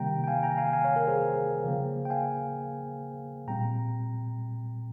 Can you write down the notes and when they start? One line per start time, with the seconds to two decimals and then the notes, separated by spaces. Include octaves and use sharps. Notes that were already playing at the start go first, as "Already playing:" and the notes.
Already playing: C3 D#3 G3 A#3 G5 A#5
0.24 G5
0.27 F5 G#5
0.43 G5 A#5
0.58 F5 G#5
0.73 F5 G#5
0.84 C#5 F5
0.96 A#4
1.07 G#4 C5
1.64 C#3 F3 A#3
2.05 G5
2.10 F5 G#5
3.47 A#2 G3 C4 G5 A#5